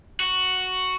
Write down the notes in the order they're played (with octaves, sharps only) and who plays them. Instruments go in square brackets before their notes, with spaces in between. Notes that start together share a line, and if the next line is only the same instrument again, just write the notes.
[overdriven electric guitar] F#4